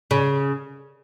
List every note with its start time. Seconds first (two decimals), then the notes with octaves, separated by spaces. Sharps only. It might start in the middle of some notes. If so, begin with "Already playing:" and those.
0.11 C#3